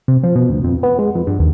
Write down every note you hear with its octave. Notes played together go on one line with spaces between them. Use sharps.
C3
F3
B2
D2
F2
B3
G#3
F2
G2
D#2